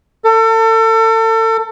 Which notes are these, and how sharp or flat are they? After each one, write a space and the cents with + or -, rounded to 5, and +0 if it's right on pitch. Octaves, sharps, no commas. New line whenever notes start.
A4 +35